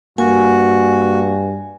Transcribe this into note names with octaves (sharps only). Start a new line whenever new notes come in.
G2 A#3 F#4 G#5